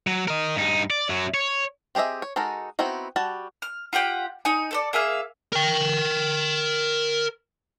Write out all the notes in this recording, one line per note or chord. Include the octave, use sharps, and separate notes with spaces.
F#3
A#4 D#5
G2 D#4
D5
F#2 F#3
C#5
C4 G4 G#4 D#5 E5
C#5
G#3 D#4 F#4 A4 A#4
B3 C4 D#4 E4 F#4
G3 F#4 A5
F6
F4 G4 F#5 G5
D#4 G#5
A4 C5 D5
A#3 G#4 E5 F5
A#4 G5